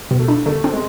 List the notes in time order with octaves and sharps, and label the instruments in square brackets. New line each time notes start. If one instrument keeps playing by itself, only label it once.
[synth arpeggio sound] B2
[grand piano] A3
[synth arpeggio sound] D4
[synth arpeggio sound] D3 [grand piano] A3
[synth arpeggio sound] C4
[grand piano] G#3